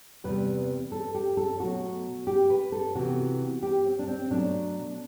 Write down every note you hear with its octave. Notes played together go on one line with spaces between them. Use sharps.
E2 C3 G3 B3 B4
A4
G4
A4
B2 F#3 A3 F#4
G4
B4
A4
C3 E3 B3 F#4
G4
C4
D4
C4
B2 F#3 A3 D4